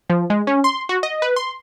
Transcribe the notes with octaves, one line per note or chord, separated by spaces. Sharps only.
F3
G#3
C#4
C6
F#4
D#5
B4
C6